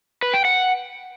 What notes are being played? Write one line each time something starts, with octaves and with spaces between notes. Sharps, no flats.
B4
G5
F#5